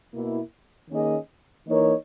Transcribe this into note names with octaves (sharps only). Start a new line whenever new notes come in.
B2 A#3 E4
D#3 A#3 C#4 G#4 D#5
E3 A#3 D#4 A#4 C#5